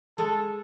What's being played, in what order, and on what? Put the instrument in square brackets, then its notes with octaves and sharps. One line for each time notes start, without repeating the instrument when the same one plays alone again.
[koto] G#3 [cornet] A4